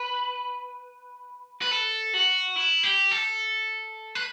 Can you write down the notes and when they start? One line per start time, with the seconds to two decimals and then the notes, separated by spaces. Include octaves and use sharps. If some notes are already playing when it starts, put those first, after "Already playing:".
Already playing: B4
1.62 B4
1.71 A4
2.14 F#4
2.56 E4
2.83 G4
3.11 A4
4.15 B4